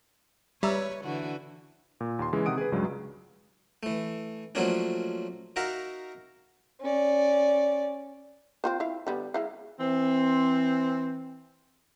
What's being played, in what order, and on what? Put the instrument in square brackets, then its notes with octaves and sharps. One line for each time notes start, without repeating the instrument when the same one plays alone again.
[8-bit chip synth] G3 [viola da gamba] B4 C#5 [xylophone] E5 A#5 E6
[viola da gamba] D3 E3 F#4
[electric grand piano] A#2
D#2 C6
C#3 E3 G#3
C3 D#3 F#5 D#6 D7
G#4 B4
C#2 G2 C#3 F#3 G#3
[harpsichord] E3 A3
F3 F#3 A3 A#3 C#4 D4
D#4 F#4 A#4 E5 F5
[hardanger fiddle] C#4 D5
[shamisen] C4 F4 C5
E4 F5
D3 G3 B3
G#3 E4 F5
[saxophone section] E3 C4